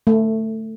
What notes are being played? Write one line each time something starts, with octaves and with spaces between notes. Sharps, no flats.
A3